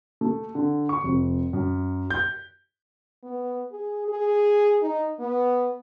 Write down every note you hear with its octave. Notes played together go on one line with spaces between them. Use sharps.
A3
D3
C#6
F1
F#2
G6
B3
G#4
G#4
D#4
B3